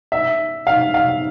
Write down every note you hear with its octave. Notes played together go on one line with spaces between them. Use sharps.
E5
F5
F5